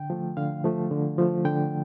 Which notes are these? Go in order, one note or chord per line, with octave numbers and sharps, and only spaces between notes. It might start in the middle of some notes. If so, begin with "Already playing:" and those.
Already playing: D3 G5
F3 A3
D3 F5
F3 A3
D3
F3 A3
D3 G5